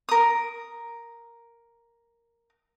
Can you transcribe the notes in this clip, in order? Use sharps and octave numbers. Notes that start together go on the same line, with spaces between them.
A#4 D#6